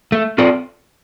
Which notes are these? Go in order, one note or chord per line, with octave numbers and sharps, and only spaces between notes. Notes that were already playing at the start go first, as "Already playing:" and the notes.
A3
C4 F4 A4 D5